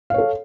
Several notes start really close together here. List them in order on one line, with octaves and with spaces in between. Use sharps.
F5 C#5 A4